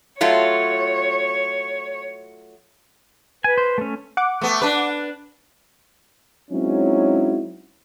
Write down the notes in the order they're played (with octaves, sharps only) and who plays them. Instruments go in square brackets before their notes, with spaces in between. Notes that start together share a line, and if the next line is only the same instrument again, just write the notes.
[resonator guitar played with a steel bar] F#3 A3 F4 [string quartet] C#5
[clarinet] B4 [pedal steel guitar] G#5
[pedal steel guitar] C5
A3 C#4
[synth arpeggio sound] F#5 D6
[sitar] A3 B3
D4 B4
[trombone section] F#3 G#3 C4 C#4 D#4 E4